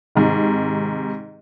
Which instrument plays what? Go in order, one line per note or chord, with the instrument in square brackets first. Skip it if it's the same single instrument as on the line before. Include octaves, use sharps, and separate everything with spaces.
[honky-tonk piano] G#2 C3 D#3